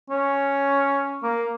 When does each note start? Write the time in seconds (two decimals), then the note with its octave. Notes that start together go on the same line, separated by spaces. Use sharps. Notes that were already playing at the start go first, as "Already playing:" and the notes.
0.10 C#4
1.23 A#3